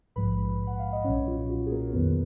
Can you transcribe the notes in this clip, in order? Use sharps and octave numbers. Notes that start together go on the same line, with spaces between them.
A#1 G#2 F3 G#3 B4 B5
F#5
F5
D#5
B1 A#2 F#3 C#4 C#5
F4
F#4
G#4
A#3 A#4
F2 D#3 F#3 B3 B4